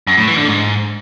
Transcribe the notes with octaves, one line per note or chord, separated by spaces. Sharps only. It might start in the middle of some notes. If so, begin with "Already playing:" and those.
F#2
A2
E3
D3
G#2